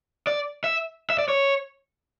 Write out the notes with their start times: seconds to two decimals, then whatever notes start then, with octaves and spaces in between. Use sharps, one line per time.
0.27 D5
0.64 E5
1.10 E5
1.18 D5
1.28 C#5